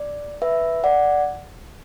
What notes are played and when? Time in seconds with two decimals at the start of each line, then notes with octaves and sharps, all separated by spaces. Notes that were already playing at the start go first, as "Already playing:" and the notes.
Already playing: D5
0.42 B4 E5
0.84 D5 F#5